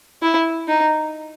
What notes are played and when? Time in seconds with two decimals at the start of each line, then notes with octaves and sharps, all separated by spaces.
0.23 E4
0.68 D#4